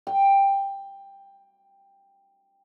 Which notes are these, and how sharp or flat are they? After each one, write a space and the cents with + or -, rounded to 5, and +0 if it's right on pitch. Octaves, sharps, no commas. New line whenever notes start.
G5 +10